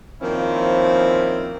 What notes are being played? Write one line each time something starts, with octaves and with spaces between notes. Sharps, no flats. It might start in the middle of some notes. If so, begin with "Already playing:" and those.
D#3 F3 A#3 C4 C#4 E4